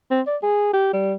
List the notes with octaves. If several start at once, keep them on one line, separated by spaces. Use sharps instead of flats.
C4
D5
G#4
G4
G3